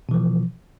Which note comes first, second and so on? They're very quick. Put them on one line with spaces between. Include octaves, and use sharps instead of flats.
B2 E3 F3